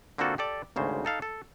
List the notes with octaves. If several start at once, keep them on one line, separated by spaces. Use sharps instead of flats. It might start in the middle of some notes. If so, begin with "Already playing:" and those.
D3 A#3 C4 F4 F#4 A4
G4 A4 D5
G#1 D2 C#3 C5
D#4 A4 F5
A4